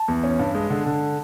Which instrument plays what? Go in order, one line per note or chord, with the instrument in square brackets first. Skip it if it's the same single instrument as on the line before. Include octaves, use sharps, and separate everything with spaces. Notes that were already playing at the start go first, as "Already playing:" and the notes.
Already playing: [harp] A5
[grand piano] E2
C#4
G2
G#3
D3
D3